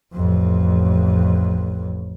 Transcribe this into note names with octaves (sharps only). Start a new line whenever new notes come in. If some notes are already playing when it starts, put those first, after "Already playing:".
A1 F2